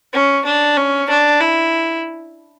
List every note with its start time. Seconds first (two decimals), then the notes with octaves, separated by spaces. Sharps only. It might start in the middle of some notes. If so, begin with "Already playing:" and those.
0.13 C#4
0.45 D4
0.77 C#4
1.09 D4
1.41 E4